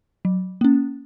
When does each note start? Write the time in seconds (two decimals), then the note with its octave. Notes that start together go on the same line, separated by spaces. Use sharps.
0.25 F#3
0.61 A#3 C#4